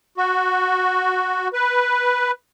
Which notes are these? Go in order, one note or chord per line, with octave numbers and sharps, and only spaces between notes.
F#4
B4